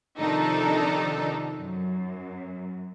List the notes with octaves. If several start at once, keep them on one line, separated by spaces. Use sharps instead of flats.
C3 D#3 F3 D4 D#4 A4
F#2